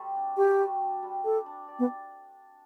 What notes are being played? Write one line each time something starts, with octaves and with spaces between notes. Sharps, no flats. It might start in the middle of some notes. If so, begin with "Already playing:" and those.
Already playing: G3 A3 C4
D4
F#4 G4
G3
D4
G3
D4 A4
D4
D5
B3